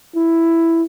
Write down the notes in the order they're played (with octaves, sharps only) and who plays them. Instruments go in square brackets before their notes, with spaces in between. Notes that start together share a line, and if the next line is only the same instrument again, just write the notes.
[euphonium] E4